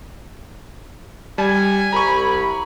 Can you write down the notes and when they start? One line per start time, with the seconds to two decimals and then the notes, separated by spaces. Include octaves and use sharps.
1.38 G3 G#5
1.92 C2 A#5 B5 C#6